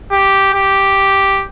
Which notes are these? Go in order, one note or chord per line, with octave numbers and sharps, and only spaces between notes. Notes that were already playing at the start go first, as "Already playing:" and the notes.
G4
G4